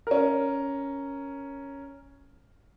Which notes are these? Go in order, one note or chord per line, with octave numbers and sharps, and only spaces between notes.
C#4 A#4